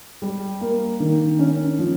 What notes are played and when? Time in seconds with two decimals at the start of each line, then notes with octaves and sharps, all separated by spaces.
0.22 G3
0.61 A#3
1.00 D#3
1.39 C#4
1.79 F3